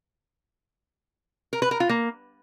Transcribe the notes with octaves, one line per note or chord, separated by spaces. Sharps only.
A#4
B4
A#4
F4
A#3